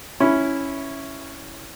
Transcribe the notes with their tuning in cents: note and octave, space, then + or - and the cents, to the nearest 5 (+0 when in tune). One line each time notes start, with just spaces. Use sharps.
C#4 +0 E4 -5